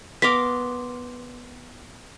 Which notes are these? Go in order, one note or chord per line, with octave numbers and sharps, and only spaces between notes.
B3 A#4 F5 C6 D6 B6